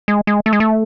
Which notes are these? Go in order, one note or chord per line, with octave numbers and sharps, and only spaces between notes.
G#3
G#3
A3
G#3
A3